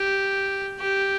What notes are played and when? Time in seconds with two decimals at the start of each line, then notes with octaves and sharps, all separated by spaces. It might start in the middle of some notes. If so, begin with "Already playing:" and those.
Already playing: G4
0.79 G4